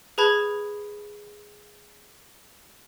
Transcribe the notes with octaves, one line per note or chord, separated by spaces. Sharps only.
G#4 B4 A5 B5 G#6